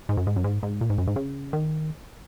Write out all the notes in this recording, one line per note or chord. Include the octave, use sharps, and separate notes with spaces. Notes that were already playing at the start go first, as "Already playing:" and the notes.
G#2
F#2
G#2
F#2
G#2
G#2
A#2
G#2
F#2
G#2
C#3
D#3